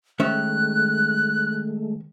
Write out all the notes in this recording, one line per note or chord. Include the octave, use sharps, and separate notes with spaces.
D#3 G#3 A3 C#4 E5 F#6